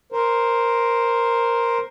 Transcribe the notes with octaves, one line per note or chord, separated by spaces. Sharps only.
A#4 C5